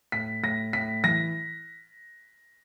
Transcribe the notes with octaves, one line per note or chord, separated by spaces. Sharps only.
A2 B6
A2 A#6
A2 B6
E3 A#6